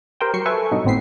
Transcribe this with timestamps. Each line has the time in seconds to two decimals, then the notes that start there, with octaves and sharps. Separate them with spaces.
0.20 G4 A#4 C5 G5
0.34 F#3 C#6 C7 C#7
0.46 A4 B4 E5 G#5 C#6
0.71 G2 B2 F#3 D#4
0.84 G#1 A2 B3 C4 B6 C7